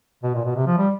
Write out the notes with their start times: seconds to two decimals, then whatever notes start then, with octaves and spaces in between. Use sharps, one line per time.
0.23 B2
0.35 A#2
0.45 B2
0.55 C3
0.67 F3
0.78 G3